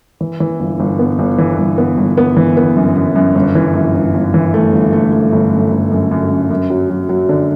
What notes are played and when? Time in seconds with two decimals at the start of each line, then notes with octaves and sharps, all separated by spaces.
0.21 E3
0.40 E3
0.60 G1
0.80 G1
0.99 B3
1.19 G1
1.38 E3
1.58 G1
1.78 B3
1.98 G1
2.18 B3
2.37 E3
2.57 B3
2.76 F#2
2.96 F#2
3.15 F#2
3.35 G1
3.55 E3
3.75 F#2
3.95 G1
4.14 G1
4.34 E3
4.54 A3
4.73 G1
4.93 A3
5.12 A3
5.32 G1
5.52 F#2
5.71 G1
5.91 F#2
6.11 F#2
6.30 F#2
6.50 F#2
6.70 F#3
6.90 F#3
7.09 F#3
7.29 D3